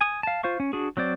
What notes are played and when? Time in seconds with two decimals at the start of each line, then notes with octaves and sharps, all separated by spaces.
0.01 G#5 D#6
0.23 F5 A5
0.43 F4 C5 F5 C#6
0.60 C#4
0.73 D4 F#4 G#4
0.97 F#3 C4 C5 D5